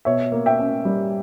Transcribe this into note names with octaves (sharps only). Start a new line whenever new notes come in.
B2 C#5 E5
A#3
E5 G5
C#4
G3